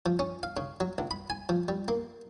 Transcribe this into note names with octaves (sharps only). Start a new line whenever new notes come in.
F3
C#4
F5
C#3
F#3
C#2
B5
G#5
F3
G3
A#3